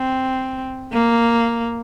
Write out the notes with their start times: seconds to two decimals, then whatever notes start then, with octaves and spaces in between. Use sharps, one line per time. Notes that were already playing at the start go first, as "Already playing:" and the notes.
Already playing: C4
0.92 A#3